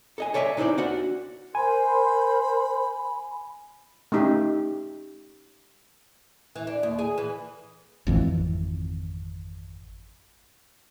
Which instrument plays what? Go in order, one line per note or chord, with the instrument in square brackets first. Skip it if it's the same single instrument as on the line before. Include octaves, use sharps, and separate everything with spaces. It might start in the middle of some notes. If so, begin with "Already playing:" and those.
[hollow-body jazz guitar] A4 D#5 G#5
A4 C#5 D5 E5 G#5
C3 D#4 E4 C5 D5
D4 F#4 F#5
[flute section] A#4 C5 C6 [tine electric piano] G#5 [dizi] B5
[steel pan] A3 C#4 D#4 G4
[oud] E3
D4
D#2
G#4
E3
[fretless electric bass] G#1 F2 E3